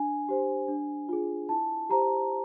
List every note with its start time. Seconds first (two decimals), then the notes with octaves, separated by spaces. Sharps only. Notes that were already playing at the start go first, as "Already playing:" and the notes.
Already playing: D4 G#5
0.28 G4 C5
0.68 D4
1.09 F4 G#4
1.49 E4 A5
1.90 G4 C5 A#5